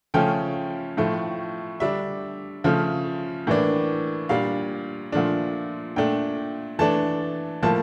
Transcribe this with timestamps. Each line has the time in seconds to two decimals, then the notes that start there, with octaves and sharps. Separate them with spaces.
0.14 C#3 F3 A3 C#4 G5
0.97 A2 F3 A3
1.80 D3 G3 D4 E5
2.64 C#3 F3 A3
3.47 A2 E3 A#3 D4
4.29 A#2 G3 D4 F5
5.12 A#2 F3 A3 D4
5.96 A#2 A3 D4 G5
6.79 E3 A3 D4 A5
7.62 A2 F3 A#3 A5